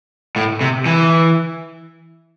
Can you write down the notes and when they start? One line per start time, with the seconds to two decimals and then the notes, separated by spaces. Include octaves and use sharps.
0.36 A2
0.61 C3
0.86 E3